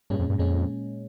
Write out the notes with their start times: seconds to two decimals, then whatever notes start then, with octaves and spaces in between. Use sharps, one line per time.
0.10 G2 A#2 G#3 C#4
0.19 F2
0.30 G2
0.38 F2 A#2 G#3 C#4